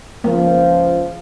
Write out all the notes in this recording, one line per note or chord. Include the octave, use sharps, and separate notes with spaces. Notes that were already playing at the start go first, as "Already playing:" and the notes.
C#2 F3 A#3